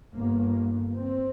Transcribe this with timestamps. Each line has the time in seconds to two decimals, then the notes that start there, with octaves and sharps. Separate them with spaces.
0.14 G1 G2 A#3
0.97 C4